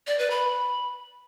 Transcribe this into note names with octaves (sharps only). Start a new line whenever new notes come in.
D5
B4
B5